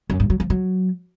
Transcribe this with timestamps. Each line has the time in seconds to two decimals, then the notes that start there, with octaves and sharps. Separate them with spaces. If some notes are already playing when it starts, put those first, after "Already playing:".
0.10 F#2
0.20 G2
0.30 F#3
0.40 F3
0.50 F#3